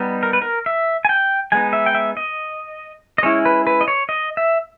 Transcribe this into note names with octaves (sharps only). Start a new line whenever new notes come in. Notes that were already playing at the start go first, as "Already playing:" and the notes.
Already playing: G3 B3 D#4
A#4
B4
A#4
E5
G#5
G5
G#3 B3 D#4 G#5
E5
G5
E5
D#5
D#5
G#3 C#4 E4 C#5
B4
B4
D#5
C#5
D#5
E5